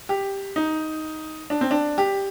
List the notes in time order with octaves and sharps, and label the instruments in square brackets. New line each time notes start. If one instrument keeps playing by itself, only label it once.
[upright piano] G4
D#4
D4
C4
D4
G4